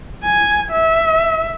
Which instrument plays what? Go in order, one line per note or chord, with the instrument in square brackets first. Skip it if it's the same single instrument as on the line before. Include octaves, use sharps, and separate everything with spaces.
[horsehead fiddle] G#5
E5